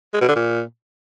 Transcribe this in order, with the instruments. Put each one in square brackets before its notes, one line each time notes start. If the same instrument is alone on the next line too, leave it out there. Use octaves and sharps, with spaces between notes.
[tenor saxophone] G#3
B2
D3
A#2